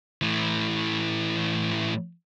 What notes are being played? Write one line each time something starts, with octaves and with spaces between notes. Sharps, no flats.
A2 E3